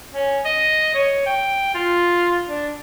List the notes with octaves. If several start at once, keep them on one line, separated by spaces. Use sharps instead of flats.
C#4
D#5
C#5
G5
F4
D4